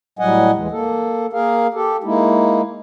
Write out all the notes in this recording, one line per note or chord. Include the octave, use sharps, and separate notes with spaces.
A2 F#3 G3 D#5 F#5 G#5
D#2 E3 G#3
A#3 A4
A#3 G#4 A#4 F5
G4 A4
G#3 A#3 D#4 E4